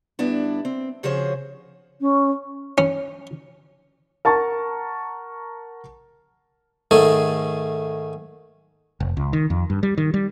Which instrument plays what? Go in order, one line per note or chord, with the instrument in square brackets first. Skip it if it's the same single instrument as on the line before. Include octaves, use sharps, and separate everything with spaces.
[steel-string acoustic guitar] G2 B3 D4 E4
C4
C#3 F3 F#4 G#4 C5 C#5
[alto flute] C#4
[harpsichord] C#4
[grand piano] A#4 F#5 A5 A#5 C#6 A6
[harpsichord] G#2 D#3 A3 G#4 A4
[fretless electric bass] F1
C#2
D#3
F2
G2
G3
D#3
G3